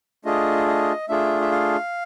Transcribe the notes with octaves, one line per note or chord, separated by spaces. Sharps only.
A3 D4 F4 G#4 D#5
D#5
A3 D4 F4 G#4 E5
E5
F5